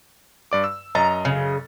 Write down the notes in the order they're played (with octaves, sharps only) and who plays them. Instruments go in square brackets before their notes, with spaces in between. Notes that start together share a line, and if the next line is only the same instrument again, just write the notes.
[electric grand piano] G2 D5 D6
E6
[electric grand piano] F#2 D#5 A6 [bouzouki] A#5
[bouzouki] C#3